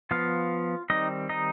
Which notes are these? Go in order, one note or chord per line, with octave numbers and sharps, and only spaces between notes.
F3 B3 F4 F5
D#3 G3 C4 D#4 D#5
D#4 D#5